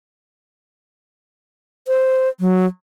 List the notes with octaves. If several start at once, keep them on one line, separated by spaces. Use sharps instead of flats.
C5
F#3